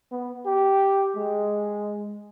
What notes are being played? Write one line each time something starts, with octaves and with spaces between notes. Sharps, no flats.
B3
G4
G#3